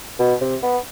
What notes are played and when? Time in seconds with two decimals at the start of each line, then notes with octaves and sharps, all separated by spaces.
0.19 B2
0.41 C3
0.63 B3